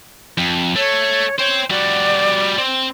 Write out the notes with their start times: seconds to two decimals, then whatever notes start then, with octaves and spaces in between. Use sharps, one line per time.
0.38 F2
0.76 A3 C#5
1.39 C5 C#5 G5
1.70 G3 F#4 D5
2.58 C4